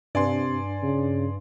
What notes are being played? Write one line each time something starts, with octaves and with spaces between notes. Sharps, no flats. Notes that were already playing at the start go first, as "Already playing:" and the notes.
G2 C3 D5 G#5 C6
C#3